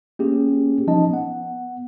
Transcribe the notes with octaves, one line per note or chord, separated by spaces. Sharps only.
A#3 C#4 G4 G#4
F3 C#4 D#4 D#5 A5
B3 F#5